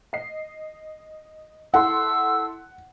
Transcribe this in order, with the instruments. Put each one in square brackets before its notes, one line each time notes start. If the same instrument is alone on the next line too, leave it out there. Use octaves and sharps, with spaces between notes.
[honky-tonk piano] D#5 C7
[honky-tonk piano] E4 A4 C6 [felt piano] F#5 [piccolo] E6